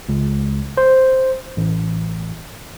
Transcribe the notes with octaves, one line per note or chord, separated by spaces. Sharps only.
C#2
C5
A1